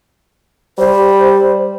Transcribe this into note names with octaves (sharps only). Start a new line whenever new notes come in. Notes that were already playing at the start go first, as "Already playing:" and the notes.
G3 C5